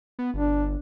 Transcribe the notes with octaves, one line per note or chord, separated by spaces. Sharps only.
B3
G1 D4